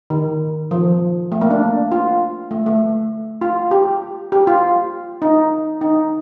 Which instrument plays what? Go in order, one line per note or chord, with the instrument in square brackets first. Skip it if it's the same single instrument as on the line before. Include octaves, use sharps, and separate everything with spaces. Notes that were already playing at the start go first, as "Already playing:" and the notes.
[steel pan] D#3
F3
A3
A#3
D4
F4
A3
A3
F4
G4
G4
F4
D#4
D#4